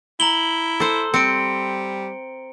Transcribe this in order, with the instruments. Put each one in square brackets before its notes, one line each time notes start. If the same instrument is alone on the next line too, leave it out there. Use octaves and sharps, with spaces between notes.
[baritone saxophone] E4 [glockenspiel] A#5 F#7 G7
[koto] A4 C5
[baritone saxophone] G3 [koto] C4 [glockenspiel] C#7 D7